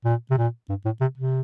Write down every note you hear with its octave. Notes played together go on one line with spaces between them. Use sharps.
A#2
C3
A#2
G2
A2
C3
C3